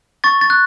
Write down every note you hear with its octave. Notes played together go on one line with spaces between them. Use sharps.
C#6 A6
A6
F#6